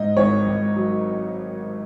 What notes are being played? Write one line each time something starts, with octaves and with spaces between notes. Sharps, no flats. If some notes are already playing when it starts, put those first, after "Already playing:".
Already playing: G#2 D#5
G#1 C#5
G#1
F#3